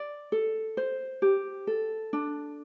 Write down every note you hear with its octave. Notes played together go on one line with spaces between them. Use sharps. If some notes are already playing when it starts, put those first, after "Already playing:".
Already playing: D5
A4
C5
G4
A4
D4